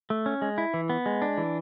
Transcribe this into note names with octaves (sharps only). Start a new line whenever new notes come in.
A3
C#4
G#3
E4
E3
B3
G#3
D4
E3